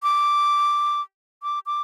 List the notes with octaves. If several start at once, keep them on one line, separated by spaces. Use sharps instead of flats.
D6
D6
D6